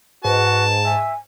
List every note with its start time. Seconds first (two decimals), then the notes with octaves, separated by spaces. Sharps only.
0.25 G#2 F#4 B4 A5
0.85 E5 G#5